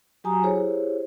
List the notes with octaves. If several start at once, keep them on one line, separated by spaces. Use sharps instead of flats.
F#3 F#4 G4 G#5 A#5 D#6
E4 G4 G#4 C5 C#5